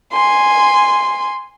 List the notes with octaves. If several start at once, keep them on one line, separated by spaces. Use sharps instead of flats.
G#5 C6